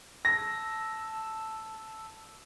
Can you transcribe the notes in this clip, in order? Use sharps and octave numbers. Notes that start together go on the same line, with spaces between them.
A5 E6 A#6